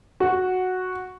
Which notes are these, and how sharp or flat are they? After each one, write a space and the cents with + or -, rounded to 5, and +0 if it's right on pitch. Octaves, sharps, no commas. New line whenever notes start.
F#4 -5